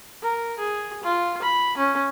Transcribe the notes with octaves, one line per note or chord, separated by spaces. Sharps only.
A#4
G#4
F4
B5
C#4